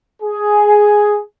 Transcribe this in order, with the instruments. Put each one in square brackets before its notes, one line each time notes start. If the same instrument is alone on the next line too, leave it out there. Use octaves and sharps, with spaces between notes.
[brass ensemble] G#4